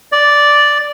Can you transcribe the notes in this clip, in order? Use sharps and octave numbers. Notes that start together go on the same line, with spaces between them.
D5